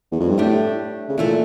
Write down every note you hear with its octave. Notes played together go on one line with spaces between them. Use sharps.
E2
F2
G2
A2 A3 D4 G4
C#3
A#2 E3 A3 E4 A4